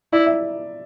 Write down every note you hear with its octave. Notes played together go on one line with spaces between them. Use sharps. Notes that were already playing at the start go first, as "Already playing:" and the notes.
E4 D5
E5